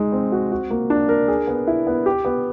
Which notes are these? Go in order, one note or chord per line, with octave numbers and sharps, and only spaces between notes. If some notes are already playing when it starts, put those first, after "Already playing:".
Already playing: G#3 D#4
C4
F#4
F#4
A#3
D4
A#4
G#4
B3
E4
B3
G4
B3